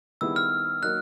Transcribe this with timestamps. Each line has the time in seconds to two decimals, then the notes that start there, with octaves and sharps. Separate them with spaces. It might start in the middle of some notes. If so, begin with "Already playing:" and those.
0.21 D#3 G3 B3 E4 G#4 E6
0.36 F6
0.82 F#3 A#3 D#4 F#6